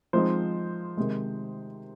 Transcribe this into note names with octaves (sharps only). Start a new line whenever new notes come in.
F3 G#3 C4 D#4 C5
C3 D#3 G#3